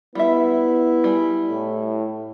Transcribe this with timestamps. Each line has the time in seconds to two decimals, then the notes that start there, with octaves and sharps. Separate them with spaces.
0.15 G3 B3 E4 E5
1.04 G3 G#4
1.50 A2